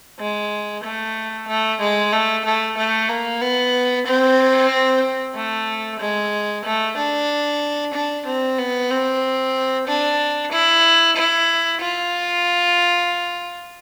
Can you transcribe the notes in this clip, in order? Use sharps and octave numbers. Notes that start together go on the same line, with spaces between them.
G#3
A3
A3
G#3
A3
A3
A3
A#3
B3
C4
A3
G#3
A3
D4
D4
C4
B3
C4
D4
E4
E4
F4